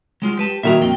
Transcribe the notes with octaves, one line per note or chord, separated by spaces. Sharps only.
F#3 G#3 F4
G4 B4 A5
A#2 D#3 F#3 E5 A5 A#5
F2 A#3 G5